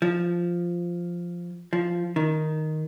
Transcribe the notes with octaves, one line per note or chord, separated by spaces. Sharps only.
F3
F3
D#3